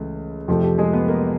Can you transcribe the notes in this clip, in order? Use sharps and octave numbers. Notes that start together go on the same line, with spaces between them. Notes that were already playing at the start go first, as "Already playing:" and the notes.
Already playing: C#2 C#3 E3 A3
F2 C3 F3 A3 G4
G4
G#3 G#4
B3 B4
A#3 A#4